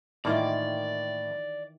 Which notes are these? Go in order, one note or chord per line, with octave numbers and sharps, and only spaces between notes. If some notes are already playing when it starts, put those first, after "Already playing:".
A2 D#3 E3 A#3 F4 D5